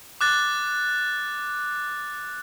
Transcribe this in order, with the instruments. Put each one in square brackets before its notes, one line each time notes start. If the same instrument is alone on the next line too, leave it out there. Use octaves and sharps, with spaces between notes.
[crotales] D6 F#6 A6